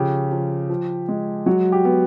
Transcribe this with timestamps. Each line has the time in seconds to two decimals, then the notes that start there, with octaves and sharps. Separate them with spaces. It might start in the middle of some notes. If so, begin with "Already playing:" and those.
Already playing: C#3 F3 G4
0.32 F3
0.69 F3
1.08 G#3
1.46 F#3 F#4
1.72 G4
1.85 B3